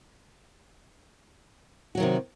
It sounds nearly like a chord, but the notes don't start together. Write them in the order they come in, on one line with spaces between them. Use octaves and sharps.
F#4 F#3 D#3 C3